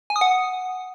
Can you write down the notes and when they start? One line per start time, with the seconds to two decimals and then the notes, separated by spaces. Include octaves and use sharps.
0.10 G#5
0.16 D#6
0.21 F#5